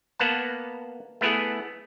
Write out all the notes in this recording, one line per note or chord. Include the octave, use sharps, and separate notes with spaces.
A#3 B3 F#5 A5
A3 B3 E4 G#4 F#5